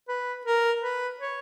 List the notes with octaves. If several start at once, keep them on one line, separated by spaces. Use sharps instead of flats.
B4
A#4
B4
C#5